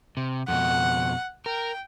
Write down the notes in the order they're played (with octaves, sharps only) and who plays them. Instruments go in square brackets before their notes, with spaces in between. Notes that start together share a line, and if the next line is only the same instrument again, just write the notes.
[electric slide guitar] C3
[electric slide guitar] F2 B2 [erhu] F#5
[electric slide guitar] A#4 [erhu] G5